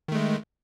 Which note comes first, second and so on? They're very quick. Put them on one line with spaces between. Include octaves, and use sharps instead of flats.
D#3 A3 G#3